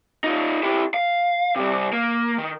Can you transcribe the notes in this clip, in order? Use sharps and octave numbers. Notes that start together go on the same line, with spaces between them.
D#4 F4
E4 G4
F5
C3 G3
A#3
D#3